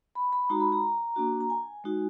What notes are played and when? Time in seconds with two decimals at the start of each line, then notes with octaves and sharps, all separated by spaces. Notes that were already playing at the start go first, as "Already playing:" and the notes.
0.15 B5
0.33 B5
0.50 G#3 D#4 F#4 A#5
0.60 B5
0.72 A#5
1.16 A#3 D4 F#4
1.40 A#5
1.50 G#5
1.84 G#3 D#4 F#4